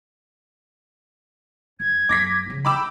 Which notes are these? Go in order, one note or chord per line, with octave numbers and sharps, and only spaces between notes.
F2 G#6
F#2 D6 A#6 B6
C#3 F3
E3 G5 B5 D6 E6